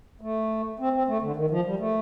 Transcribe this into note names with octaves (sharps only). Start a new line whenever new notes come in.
A3
C4
C4
A3
D3
D#3
F3
G3
A3